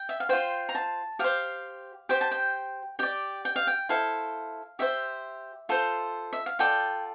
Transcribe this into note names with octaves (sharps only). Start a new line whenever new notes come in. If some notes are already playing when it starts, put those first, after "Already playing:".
Already playing: G5
E5
F5
F4 C5 G5
A#5
A5
G4 C5 F5
G4 C5 G5
A5
G5
G4 D5 G5
G5
F5
G5
E4 A4 C5 F5
G4 C5 E5
F4 A4 C5
E5
F5
F4 A4 D5 G5